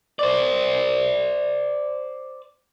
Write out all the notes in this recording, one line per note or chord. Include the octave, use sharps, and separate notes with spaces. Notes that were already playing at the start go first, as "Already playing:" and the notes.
C5 D5